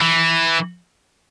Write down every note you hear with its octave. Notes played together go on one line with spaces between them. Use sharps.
E3